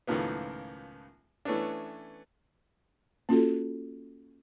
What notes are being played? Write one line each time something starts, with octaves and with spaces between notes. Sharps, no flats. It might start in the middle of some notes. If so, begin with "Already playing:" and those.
C#2 A2 D#3 F3 A#3 B3
E3 A3 B3 C#4 D4
A#3 C#4 F4 F#4 A4